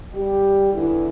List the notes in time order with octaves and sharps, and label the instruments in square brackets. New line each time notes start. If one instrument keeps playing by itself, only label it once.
[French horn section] G3 G4
E2 D3 E3 E4